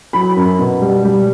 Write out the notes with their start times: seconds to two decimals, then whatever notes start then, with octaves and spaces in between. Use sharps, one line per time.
0.13 F#3 B5
0.36 F#2
0.59 B2
0.81 G3
1.05 G3